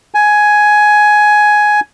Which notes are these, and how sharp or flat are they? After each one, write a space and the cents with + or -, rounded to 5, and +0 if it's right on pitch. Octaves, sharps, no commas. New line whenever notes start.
G#5 +10